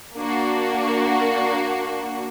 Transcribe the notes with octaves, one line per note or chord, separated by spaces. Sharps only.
A#3 D4 F#4